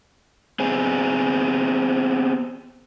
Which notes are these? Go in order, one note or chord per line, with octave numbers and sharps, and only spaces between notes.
B3 C4 G#4